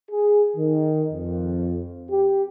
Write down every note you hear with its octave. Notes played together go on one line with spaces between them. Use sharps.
G#4
D#3
F2
G4